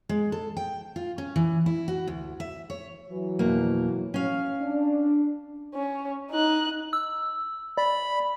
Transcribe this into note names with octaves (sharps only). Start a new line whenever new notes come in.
G#3
A4
G5
F4
C#4
E3
E4
F#4
D2
E5
C#5
E3 F#3
F2 B2 A#3
C#4 F5
D4
C#4
D#4 F#6
E6
D5 B5